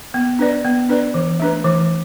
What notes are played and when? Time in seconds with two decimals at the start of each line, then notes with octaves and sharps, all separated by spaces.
0.14 B3
0.39 D4 B4 D5
0.65 B3
0.89 D4 B4 D5
1.14 E3
1.40 A3 D4 B4
1.64 E3